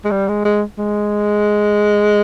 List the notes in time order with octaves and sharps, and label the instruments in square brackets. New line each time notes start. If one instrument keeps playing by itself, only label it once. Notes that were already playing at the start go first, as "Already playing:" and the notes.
[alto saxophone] G#3
G3
G#3
G#3
G#3